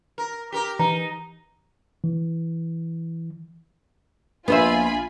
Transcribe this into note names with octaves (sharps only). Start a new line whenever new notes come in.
A#4
G4 A#4
E3 D#4 A#5
E3
A#1 B3 F4 C5 E5 G#5 B5